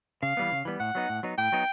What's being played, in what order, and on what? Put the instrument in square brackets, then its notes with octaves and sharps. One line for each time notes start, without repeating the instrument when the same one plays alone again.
[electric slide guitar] C#3 [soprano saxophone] F5
[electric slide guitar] E3 G3 B3
C#3
E3 G3 B3
[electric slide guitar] A2 [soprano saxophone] F#5
[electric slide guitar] F#3 B3 D#4
A2
F#3 B3 D#4
[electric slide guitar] A2 [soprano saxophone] G5
[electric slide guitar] F#3 B3 D#4